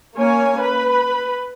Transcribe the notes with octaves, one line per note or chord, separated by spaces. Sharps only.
A#3 C#4 C#5 G#5
B4 B5